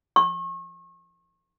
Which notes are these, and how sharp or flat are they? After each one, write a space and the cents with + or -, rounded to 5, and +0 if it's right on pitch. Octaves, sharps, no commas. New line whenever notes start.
C#6 -35